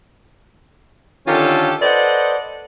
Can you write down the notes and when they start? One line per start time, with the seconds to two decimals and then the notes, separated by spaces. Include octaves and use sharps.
1.27 D3 D#3 C#4 F4 G4 A4
1.82 A4 B4 C5 D5 D#5 F#5